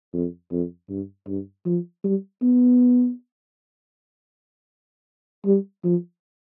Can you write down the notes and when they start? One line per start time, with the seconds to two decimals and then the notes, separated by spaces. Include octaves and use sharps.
0.14 F2
0.52 F2
0.90 G2
1.28 G2
1.66 F3
2.04 G3
2.42 B3
5.46 G3
5.84 F3